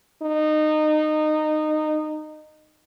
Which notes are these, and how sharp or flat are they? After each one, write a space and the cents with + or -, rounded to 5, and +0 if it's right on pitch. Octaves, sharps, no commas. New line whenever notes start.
D#4 -20